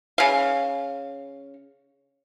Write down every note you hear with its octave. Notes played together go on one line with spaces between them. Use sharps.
C#3 F5